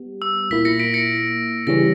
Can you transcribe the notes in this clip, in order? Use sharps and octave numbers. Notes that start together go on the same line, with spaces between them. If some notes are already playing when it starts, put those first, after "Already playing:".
Already playing: G3 B3
E6
A#2 A#3 E4 B6
A#6 C#7
B6 D7
A#6 C#7
C#3 E3 G3 C#4 A#6